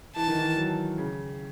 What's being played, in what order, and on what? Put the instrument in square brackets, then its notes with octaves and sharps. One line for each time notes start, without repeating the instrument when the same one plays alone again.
[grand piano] E3 [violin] A5
[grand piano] D#3
E3
F#3
C#3